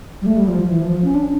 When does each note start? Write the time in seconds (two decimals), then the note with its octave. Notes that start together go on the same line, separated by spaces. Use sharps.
0.22 G3
0.26 A3
0.36 G3
0.48 F3
0.59 F3
0.70 E3
0.81 F3
0.92 F3
1.04 C#4
1.15 D4